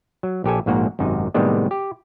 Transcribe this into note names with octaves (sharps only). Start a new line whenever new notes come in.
F#3
A#1 G4 A4 G#5
A#1 G#2 A#3 F#4
G#1 F#2 C3 D#4
A2 C3 D#3 G3 G#3 B3
G4